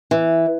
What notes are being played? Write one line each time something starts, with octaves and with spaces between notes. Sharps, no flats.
E3